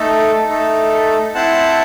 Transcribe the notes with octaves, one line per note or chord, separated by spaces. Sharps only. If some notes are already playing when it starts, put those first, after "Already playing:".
Already playing: A3 D#4 A4
A3 D#4 A4
C4 E4 C5 F#5 A5